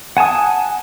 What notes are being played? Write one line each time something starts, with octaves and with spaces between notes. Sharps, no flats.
F#5 G#5 A5 D#6